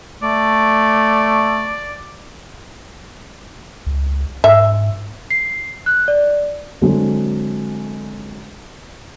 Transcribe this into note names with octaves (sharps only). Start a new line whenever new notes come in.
A3 D5
C#2
G#2 E5
C7
F#6
D5
D3 F#3 G#3 C4